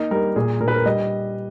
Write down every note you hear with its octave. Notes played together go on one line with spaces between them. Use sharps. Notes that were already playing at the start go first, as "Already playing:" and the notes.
Already playing: A#3 D#4 A#4
G3 A#4
A#2 G#4
A#2 A#4
B4
A#4
G3 D#5